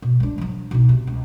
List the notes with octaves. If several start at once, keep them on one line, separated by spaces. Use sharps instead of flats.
B2
G#3 D4
F3 F#3
B2 D#4
C3
C#2